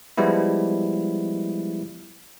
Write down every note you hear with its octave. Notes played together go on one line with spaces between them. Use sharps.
F3 G3 G#3 B3 E4